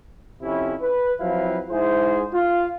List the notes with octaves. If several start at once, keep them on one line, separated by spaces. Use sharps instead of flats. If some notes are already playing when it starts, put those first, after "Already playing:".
F2 C3 C#4 E4
B4
F3 F#3 C4 E4 B4 F5
G#2 E4 G#4 C5
F4